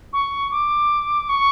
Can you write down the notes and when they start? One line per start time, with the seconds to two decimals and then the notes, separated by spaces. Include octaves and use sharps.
0.13 C#6
0.51 D6
1.29 C#6